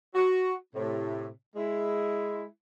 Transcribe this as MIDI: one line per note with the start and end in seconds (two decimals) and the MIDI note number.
0.15 0.54 66
0.75 1.27 45
0.75 1.27 48
1.56 2.45 56
1.56 2.45 64